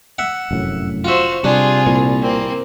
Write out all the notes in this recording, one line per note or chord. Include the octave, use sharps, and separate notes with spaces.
E5 F#5
F1 F#2 A2
F4 F#4 C5 E5
C3 G3 D4 F4 G#4
C2 A#2
A#3 C4